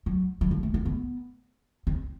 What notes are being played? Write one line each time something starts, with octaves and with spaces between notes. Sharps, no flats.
F#3
F#3
F3
A3
A#3
B3
C4